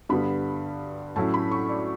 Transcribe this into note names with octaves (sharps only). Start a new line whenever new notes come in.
G2 D3 G3 B3 B5
A2 F#3 C#4 E4 A5
B5
C#6
D5